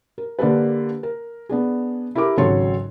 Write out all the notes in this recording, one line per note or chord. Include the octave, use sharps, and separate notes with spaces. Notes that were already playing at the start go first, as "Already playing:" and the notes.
A#4
D3 A#3 G4 A4 B4
A#4
B3 D4 G#4
E4 G4 A4 A#4 D6
G#1 C#3 F#3 A4 C#5 C6